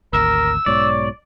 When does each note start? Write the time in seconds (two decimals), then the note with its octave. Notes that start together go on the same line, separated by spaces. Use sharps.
0.13 G#1 D2 A#4 E6
0.66 B1 G#2 B2 C#5 D5